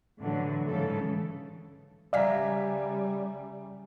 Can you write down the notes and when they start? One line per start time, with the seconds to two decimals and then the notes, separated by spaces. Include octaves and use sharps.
0.19 A2 D3 E3 F#3
0.67 G#2 C#3 E3 A4
2.13 C#3 G3 D5 E5 F5 G#5 A#5 B6